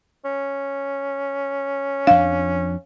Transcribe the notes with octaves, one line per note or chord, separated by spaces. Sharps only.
C#4
F2 D4 F5